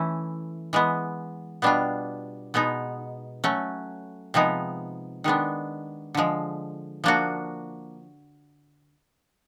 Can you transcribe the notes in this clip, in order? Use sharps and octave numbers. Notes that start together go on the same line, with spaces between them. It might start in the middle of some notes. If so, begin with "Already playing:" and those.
Already playing: E3 A3 C#4 E4
E3 G#3 B3
B2 G3 B3 D4 F4
B2 G#3 B3 D#4
F#3 A3 C#4
C3 F3 G#3 B3 D#4
D#3 G#3 B3 D4
D3 F3 G#3
F3 A#3 D4 F#4